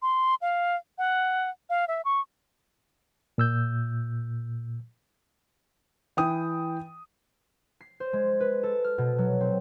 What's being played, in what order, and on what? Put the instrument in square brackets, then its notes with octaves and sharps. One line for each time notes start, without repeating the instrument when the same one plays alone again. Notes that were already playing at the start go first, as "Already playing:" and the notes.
[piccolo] C6
F5
F#5
F5
E5
C#6
[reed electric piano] A#2 E6 G6
[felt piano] E3 G5 D#6
[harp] C7
C5
G#3
B4
A4
F6
B2
F#3
C4